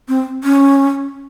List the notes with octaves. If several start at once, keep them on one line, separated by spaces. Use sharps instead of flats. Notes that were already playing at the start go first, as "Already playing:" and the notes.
C4
C#4